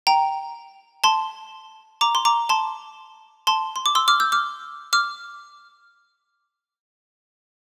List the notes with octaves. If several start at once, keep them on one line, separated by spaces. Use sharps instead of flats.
G5 A#5
A5 C6
A#5 D6
C6
A#5 D6
A5 C6
A5 C6
C6
D6
C6 E6
D6 F6
E6 G6
D6 F6
D6 F6